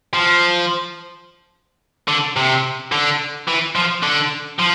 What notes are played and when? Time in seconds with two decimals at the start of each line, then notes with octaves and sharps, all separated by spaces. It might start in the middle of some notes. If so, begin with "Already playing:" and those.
0.14 F3
2.08 D3
2.36 C3
2.92 D3
3.48 E3
3.75 F3
4.03 D3
4.60 F3